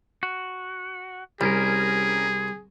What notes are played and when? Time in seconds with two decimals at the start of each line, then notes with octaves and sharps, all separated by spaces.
0.23 F#4
1.41 C2 G3 C#4 G#4 A#4